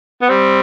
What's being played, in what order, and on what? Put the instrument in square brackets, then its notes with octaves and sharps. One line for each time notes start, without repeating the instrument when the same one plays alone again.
[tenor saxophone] B3
[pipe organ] G3 [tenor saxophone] C4